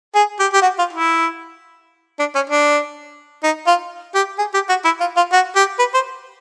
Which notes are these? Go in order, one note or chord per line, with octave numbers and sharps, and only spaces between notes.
G#4
G4
G4
F#4
F4
E4
D4
C#4
D4
D#4
F4
G4
G#4
G4
F#4
E4
F4
F4
F#4
G4
B4
C5